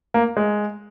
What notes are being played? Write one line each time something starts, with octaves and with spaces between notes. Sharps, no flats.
A#3
G#3